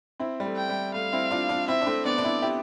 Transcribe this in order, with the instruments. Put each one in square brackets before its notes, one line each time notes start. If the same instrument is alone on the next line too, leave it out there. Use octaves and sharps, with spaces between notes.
[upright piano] C4 E4
G3
A3
[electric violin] G5
[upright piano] G3
[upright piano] A3 [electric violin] F5
[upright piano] C4 E4
D4 F4
D4 F4
[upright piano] C4 E4 [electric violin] E5
[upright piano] D4
A3 C4
[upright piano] B3 D4 [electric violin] D5
[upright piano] D4
C4 E4
E4 G4